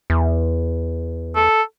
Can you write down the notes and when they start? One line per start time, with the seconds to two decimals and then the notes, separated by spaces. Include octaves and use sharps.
0.10 E2
1.36 A4